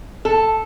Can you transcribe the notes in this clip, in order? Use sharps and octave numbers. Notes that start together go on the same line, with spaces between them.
A4